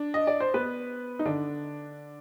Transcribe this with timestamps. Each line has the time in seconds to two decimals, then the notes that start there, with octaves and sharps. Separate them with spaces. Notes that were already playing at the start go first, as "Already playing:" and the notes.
Already playing: D4
0.14 D#5
0.27 D5
0.40 C5
0.54 B3 B4
1.19 D#4
1.26 D3 D4